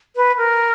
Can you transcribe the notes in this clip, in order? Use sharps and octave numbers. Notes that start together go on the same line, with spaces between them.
B4
A#4